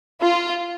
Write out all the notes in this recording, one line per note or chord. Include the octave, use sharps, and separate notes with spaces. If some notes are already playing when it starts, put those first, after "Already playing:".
F4